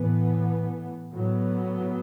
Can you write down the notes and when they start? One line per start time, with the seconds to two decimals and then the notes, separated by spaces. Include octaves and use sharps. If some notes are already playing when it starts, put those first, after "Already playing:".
Already playing: A2 E3 B3
1.12 A2 F#3 B3